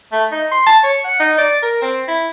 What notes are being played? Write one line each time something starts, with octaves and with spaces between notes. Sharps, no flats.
A3
D#4
C6
A5
C#5
F#5
D#4
D5
A#4
C4
E4